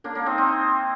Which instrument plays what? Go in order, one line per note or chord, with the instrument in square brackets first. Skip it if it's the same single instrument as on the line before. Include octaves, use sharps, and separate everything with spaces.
[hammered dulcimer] A#3 D4
A#3 D4
C4 D#4
C4 D#4